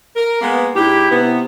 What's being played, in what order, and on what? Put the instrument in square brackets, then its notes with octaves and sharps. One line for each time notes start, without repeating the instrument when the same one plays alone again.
[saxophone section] A#4
G#3 A#3 B3
[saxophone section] G#2 D4 G4 [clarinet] E4
[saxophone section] C3 B3